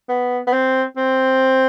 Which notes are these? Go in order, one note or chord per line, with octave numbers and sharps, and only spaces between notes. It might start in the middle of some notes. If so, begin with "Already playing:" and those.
B3
B3
C4
C4